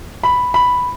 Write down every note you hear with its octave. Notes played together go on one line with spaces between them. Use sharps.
B5
B5